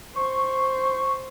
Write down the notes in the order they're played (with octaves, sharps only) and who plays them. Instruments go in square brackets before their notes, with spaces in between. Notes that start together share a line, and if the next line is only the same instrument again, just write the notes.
[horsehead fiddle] C5 [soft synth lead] C#6